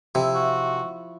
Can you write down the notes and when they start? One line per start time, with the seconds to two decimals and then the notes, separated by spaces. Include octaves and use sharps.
0.15 C3 F3 E4
0.35 F#4